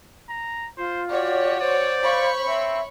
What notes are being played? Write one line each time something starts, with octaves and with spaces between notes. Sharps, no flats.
A#5
F4 C5
F#4 G4 C#5 D5
C5 D5
C#5 F5 B5 C#6
C4 E5